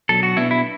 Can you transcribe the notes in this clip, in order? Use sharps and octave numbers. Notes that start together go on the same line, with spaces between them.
B2 F#3 D4 A4
F#4
B2 B3 D4 E4
E4